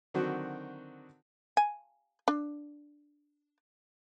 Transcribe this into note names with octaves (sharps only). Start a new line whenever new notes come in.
D3 D#3 F#3 C4 F#4
G#5
D4